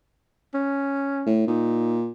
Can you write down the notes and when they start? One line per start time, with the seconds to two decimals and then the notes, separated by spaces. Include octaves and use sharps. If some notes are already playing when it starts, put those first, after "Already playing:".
0.54 C#4
1.26 A2
1.48 A#2 D#4